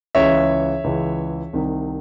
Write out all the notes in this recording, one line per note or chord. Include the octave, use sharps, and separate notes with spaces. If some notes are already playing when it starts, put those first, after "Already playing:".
C#2 C#3 E3 C#5 E5
C#2 C#3 E3
C2 C3 D#3